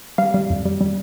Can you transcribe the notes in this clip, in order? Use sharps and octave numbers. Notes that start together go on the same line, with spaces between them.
G3 F5
G3
F2
G3
G3